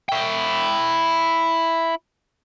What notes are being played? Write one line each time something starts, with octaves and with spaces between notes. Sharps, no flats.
E4 G5